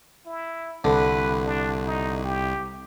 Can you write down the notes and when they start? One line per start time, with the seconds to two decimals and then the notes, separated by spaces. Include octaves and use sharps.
0.26 E4
0.84 C2 D3 B4
1.46 D4
1.85 D#4
2.23 G4